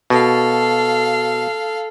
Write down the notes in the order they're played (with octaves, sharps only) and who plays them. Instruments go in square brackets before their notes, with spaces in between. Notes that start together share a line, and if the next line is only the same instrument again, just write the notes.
[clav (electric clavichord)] B2 [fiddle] A4 F5